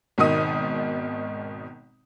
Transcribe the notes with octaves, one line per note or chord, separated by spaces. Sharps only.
G#1 B2 D#3 D#4 D#6 D#7